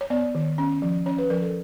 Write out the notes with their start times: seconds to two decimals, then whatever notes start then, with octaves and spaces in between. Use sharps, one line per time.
0.01 C#5
0.10 B3 D5
0.35 D#3
0.58 C#4
0.82 F3
1.06 C#4 C#5
1.18 B4
1.30 F3 A#4
1.42 A4